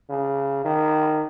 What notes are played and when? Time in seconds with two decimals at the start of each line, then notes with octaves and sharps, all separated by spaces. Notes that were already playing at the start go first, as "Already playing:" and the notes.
0.09 C#3
0.65 D#3